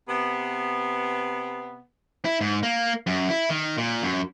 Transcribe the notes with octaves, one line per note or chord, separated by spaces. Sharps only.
C3 B3
E4
G#2
A#3
F#2
E4
D#3
A#2
F#2